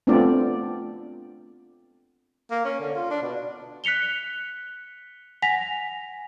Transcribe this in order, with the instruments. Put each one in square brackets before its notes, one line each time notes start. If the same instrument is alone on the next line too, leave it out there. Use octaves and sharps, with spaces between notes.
[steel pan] A3 B3 C4 D4 F4 D5
[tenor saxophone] A#3
C#4
D3
F4
D4
B2
[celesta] F#6 B6 C#7 F7 G7
F#5 G#5 A#6 B6 F7